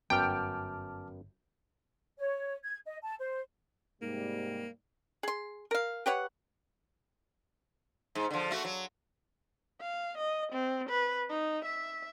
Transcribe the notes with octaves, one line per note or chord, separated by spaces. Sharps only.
G1 F#2 B3 G5 A5 D6 F6
C#5
G#6
D#5
A5
C5
G#2 C3 G3 A#3
G#4 C6
A#4 F5
G4 B4 C#5 F#5
G#2
D3 F3
A3 F#4
F#3
F5
D#5
C4
B4
D#4
E5